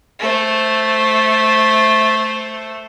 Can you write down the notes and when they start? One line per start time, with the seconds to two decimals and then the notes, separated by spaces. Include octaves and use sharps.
0.19 A3 C5